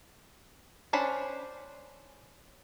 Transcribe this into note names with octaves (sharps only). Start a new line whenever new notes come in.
C#4 D4 C5 B5